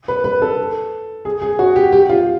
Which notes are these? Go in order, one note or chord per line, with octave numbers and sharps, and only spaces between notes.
B4
B4
A4
G#4
G#4
F#4
G4
G4
F4